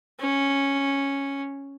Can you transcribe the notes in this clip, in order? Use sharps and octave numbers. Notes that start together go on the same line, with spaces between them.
C#4